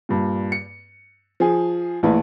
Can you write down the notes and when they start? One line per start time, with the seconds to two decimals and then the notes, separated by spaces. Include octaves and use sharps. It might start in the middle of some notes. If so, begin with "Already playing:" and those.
0.09 G2 A#2
0.52 C#7
1.40 F3 G#4
2.03 A#1 A2 E3